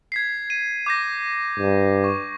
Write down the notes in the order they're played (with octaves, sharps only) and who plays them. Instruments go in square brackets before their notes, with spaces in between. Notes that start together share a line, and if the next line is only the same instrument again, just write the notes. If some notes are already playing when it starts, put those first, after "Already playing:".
[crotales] G#6 B6 C7
D#7
D6 G6 A#6
[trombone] G2
[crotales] C#6